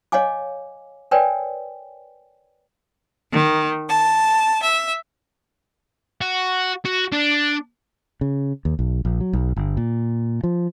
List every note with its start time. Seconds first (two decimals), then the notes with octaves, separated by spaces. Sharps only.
0.12 C#5 D#5 F5 G#5 D6
1.11 A#4 B4 C#5 D5 G5 G#5
3.32 D#3
3.88 A5
4.61 E5
6.21 F#4
6.85 F#4
7.12 D4
8.21 C#3
8.65 D#2
8.79 B1
9.05 A#1
9.20 F#3
9.33 B1
9.56 G1
9.77 A#2
10.44 F3